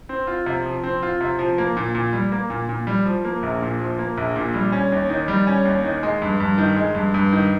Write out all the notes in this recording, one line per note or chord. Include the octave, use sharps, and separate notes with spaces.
C4
F4
C3
F3
C4
F4
C3
F3
A#3
A#2
A#2
G3
A#3
A#2
A#2
G3
F3
A#3
A#1
A#2
F3
A#3
A#1
A#2
G3
C#4
D#2
D#3
G3
C#4
D#2
D#3
G#3
G2
G2
D#3
G#3
G2
G2
D#3